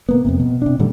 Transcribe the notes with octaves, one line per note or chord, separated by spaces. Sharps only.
C3 A#3 B3
F2 G#2 C3
B2
C3 D4
A2 D3 G3 A3